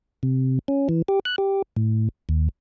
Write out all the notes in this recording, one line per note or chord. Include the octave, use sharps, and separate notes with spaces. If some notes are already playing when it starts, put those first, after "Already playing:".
C3
C#4
E3
G4
F#6
G4
A2
D#2